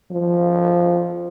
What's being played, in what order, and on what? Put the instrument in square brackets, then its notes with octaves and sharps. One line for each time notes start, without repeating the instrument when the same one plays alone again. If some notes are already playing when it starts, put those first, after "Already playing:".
[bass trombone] F3